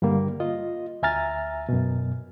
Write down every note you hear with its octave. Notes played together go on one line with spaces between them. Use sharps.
G2 D3 G3 A#3
F4 D#5
D2 E5 G#5 A#5 F6 A6
F#2 B2